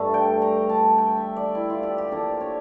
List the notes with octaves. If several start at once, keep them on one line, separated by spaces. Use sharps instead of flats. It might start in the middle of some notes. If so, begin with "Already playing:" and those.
Already playing: G2 D3 A3 A5
G5
A#5
A5
G5
E5
D5
E4
F4
G4
G4
D3 F3 A#3 A4
C#5